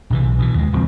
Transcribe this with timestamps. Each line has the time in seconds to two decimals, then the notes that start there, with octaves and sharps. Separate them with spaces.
0.10 A#1 C3 E3
0.24 B1
0.38 B2 D#3 E3
0.54 D#2 G#3
0.72 D#1 C#2 F3 C4